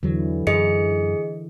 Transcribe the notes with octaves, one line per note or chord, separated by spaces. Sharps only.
E2 D3 E3 F#3
F#2 G#4 D#5 C#7